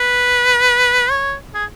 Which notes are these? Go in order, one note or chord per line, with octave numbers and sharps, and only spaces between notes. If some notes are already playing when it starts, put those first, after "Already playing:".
Already playing: B4
C#5
G#4